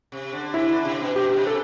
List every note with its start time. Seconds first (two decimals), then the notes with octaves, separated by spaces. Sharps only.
0.12 C3
0.33 D3
0.53 C3 E4
0.70 D3
0.85 C3
1.00 B2
1.16 B2 G4
1.29 B2
1.36 C3
1.47 A4